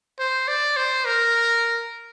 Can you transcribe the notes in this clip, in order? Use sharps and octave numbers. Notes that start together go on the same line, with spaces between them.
C5
D5
C5
A#4